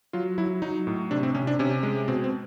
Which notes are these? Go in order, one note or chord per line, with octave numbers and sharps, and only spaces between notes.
F#3 F4
F#3 E4
F#3 D#4
A2
C3 D4
C4
C3 C#4
D4
C3 C#4
G#3
B2 C4
C4